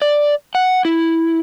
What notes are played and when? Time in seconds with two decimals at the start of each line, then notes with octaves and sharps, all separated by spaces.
0.02 D5
0.55 F#5
0.85 E4